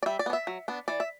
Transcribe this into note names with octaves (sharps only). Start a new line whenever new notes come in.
D5
G3 E5
D5
B3 D4
E5
F#3
B3 D4
E3 D5
E5